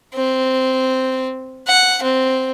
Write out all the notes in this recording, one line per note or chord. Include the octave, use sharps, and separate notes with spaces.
C4
F#5
C4